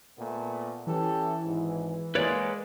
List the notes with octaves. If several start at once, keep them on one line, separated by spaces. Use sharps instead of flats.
A#2 A3 B3
E3 C#4 G4 A4
G#1 G#2
G#3 A#3 B4 C#5 D5